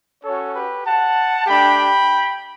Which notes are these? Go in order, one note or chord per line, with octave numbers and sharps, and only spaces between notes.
C#4 F#4 A4 C#5
G4 B4
F#5 A5
A3 D4 G4 G5 B5